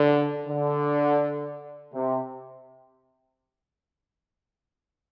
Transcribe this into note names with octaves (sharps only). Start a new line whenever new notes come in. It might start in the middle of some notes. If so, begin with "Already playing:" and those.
Already playing: D3
D3
C3